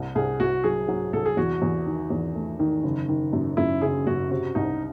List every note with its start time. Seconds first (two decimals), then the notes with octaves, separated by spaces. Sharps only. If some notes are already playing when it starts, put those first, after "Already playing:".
Already playing: C2
0.15 C2 G#4
0.40 C2 F#4
0.64 F#3 G#4
0.88 F#3
1.13 C2 A4
1.26 G#4
1.37 E2 F#4
1.62 E2
1.86 D#3
2.10 E2
2.35 A3
2.59 D#3
2.84 F#1
3.09 D#3
3.33 F#2
3.57 F#2 E4
3.82 F#1 G#4
4.07 F#2 F#4
4.31 C3 F#4
4.55 C2 D#4